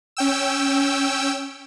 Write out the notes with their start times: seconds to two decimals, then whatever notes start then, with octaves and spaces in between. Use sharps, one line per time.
0.17 C#4 G5 E6